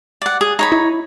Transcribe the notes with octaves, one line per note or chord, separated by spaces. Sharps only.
D5 F#5
G#4
D#4 C#5 B5
E4